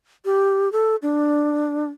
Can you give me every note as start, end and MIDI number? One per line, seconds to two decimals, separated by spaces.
0.25 0.71 67
0.72 0.96 69
1.02 1.89 62